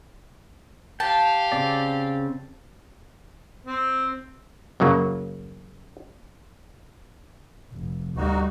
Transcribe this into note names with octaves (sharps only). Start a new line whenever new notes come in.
G4 F5 G5 A5
C#3 C4 D5
C4
F#2 C#3 F#3 A#3
F1
D2 G3 A#3 D#4 F#4